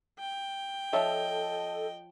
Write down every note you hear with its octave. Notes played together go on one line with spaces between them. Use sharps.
G5
F3 A4 C#5 D#5 E5